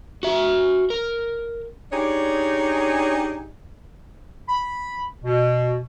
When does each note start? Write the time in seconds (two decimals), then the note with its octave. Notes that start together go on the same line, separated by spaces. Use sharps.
0.23 F#4 E5
0.90 A#4
1.92 D4 D#4 G4 G#4 C#5 D5
4.49 B5
5.24 B2